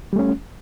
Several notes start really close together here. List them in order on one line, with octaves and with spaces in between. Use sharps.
G3 A3 C#4